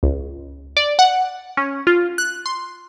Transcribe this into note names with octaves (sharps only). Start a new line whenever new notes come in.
C#2
D5
F#5
C#4
F4
F#6
C6